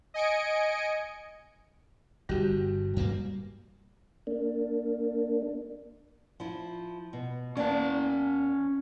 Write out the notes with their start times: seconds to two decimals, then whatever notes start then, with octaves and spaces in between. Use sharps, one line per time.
0.14 D#5 G#5 C#7 D7
2.29 G1 G2 G3 F#4 G4
2.96 G2 G3 A#3
4.27 A#3 D4
6.40 F3 E4
7.13 B2
7.57 E2 A#3 C#4 D5 A5